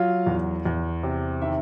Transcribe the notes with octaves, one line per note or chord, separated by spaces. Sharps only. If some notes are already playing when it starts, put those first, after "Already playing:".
Already playing: F#3 F4 F5
E2
E2
C3
D#3 E5